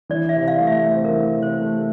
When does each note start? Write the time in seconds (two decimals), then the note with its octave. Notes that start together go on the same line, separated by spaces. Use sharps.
0.09 E3 D5
0.29 E5
0.35 C3
0.48 F5
0.61 A3
0.67 E5
0.86 C4
1.05 A#4
1.11 E3
1.36 C3
1.42 C5
1.61 A3